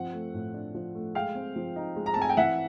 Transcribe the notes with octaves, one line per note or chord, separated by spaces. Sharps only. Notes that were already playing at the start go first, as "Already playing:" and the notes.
Already playing: F3 C4 F#5
A3
A2
D4
F3
A3
G#3 F5 G5
C4
F3
D#4
G#3
A#5
C4 A5
G#5
G5
E3 E5 F#5